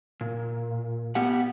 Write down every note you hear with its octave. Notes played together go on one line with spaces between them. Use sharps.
A#2
B3 G4 F#5